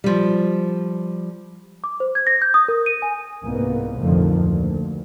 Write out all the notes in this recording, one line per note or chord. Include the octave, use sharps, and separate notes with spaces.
F3 G3
D6
C5
G#6
A#6
G6
D#6
A#4
D#7
G#5
C2 G#2 A#3 B3
B1 F2 A2 D3 D#3 F3
D2 A#2